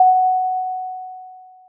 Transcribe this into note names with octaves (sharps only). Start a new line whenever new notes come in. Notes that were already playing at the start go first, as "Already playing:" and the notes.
Already playing: F#5